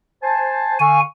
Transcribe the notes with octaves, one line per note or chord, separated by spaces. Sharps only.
C5 G#5 A5
D3 F5 G#5 C#6